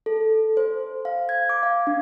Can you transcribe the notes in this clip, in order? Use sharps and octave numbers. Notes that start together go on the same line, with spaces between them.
A4
C5
F5
G#6
D6
F5
D4